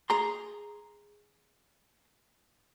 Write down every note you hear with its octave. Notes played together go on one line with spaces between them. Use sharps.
G#4 A#5 C6